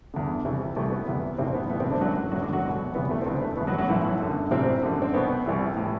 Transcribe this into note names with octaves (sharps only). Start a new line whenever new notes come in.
E2 D3
C2 C3 E3
C2 C3 E3 A3
B3
E2 C3 E3
B1 A2 C3 E3 C4
B3
B1 A2 E3 B3
C3 C4
D3 D4
E3 F#3 F#4
F#2
D3 F#3 F#4
E2
D3 D4
F#3 F#4
C2 B2
E2 C3 E3 B3
A3
C4
D2 C3 E3 B3
A3
E2 B2 B3
F#3 F#4
F#3 F#4
B1 A2 E3 E4
F#2 D3
A1 A2 C3 E3 C4
F#2 D3
C4
C2 B2 B3
C2 C3 E3
A2 E3